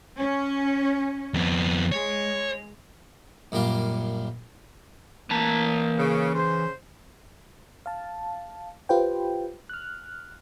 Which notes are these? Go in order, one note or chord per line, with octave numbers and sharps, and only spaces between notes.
C#4
F2 B3
G#3 C#5
F#2 A#2 G3 D4 F4
E3 A#3 A5 A#5
C#3
C#3 C5
F5 A5
F4 G4 B4 C5 G5
F6 F#6